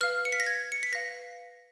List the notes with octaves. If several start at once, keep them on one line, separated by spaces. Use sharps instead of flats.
B4 F5 F6
C#7
B6
A#6
G#6
C#7
B6
B4 F5 A#6